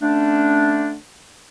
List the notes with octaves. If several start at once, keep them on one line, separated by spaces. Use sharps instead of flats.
D3 A3 C#4 D4